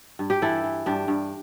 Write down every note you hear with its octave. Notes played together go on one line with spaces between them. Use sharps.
G2
G4
E3 E4 A4
E3
G2 D4 G4
G2